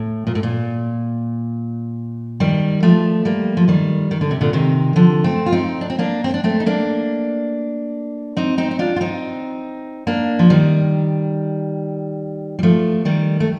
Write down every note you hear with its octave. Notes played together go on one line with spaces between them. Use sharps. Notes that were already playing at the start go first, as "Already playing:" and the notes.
Already playing: A2
A#2
A2
A#2
D#3 G3
F3 A3
G3 A#3
F3
D#3 G3
D#3
D3
C3
A#2 D3
C3 D#3
D3 F3
A3 C4
F4
C4 D#4
D4
C4
A#3 D4
C4
D4
A3 C4
D#4
A#3 D4
C4 D#4
C4 D#4
D#4
D4 F4
F4
C4 D#4
A#3 D4
F3
D#3 G3
G3
F3 A3
D#3 G3
A3